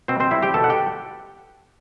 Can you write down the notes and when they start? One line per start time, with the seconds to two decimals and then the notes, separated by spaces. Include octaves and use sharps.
0.08 B2 C4 C5
0.20 C4 C5
0.31 G3 C4 E4 E5
0.43 G4 G5
0.54 B2 A4 A5
0.64 F#5
0.70 G4 G5